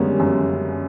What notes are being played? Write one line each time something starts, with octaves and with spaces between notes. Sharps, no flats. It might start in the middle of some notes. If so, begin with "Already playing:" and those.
Already playing: F#2 D3 G3 G#3 A#3 B3 C#4
F#2